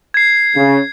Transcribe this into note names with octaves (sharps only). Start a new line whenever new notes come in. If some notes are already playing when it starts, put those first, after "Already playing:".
G#6 C7
C#3